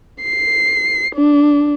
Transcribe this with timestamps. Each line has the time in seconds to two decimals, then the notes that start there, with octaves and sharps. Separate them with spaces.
0.23 C7
1.15 D4